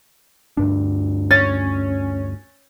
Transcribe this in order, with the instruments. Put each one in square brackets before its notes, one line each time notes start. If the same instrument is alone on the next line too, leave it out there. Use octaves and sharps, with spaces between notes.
[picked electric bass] D2 G2 D4
[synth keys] C#4 [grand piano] A6